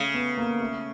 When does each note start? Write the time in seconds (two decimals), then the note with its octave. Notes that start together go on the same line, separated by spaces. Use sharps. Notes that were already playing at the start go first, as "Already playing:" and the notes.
Already playing: C#3 A3
0.14 B3
0.38 A#3
0.61 A3